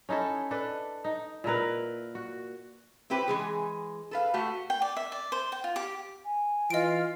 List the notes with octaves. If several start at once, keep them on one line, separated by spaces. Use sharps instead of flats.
C#4 D#4 E4 A4
D4 A4 B4
D#4
A#2 E4 A#4 B4
F#4
C4 E4 G4 B4
E3 G#3 G#4
A4 B4 F5
A3 F#4 G4
G5
D5
E5
D5
C5
G5
F4
G4
G#5
E3 F4 D#5 D7